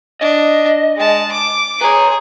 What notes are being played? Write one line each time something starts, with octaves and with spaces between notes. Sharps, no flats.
D4 D#5
G#3 A5
D6
G#4 B4 C#5 A#5